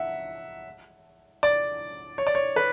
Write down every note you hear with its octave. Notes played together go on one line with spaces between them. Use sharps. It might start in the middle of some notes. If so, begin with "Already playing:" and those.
Already playing: E5 F#5
D5
C#5
D5
C#5
B4